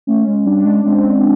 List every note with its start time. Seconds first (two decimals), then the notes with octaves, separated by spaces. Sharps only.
0.07 A3 C#4
0.27 G#3
0.46 G3 D4
0.65 G#3
0.85 G#3 C4